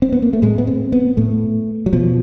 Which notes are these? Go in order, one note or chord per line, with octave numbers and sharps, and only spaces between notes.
C4
B3
A#3
A3
A2 G#3
B3
C4
B3
A2 A3
F#3
B2 F3